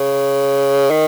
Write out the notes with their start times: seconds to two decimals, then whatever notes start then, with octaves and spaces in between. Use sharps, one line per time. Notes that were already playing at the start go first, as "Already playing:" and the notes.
Already playing: C#3
0.90 D#3